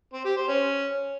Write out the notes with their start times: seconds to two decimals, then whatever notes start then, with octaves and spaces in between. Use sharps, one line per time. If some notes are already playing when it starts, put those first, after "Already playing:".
0.13 C4
0.25 G4
0.37 C5
0.48 C#4